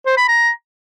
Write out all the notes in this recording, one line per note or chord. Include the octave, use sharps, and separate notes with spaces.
C5
B5
A#5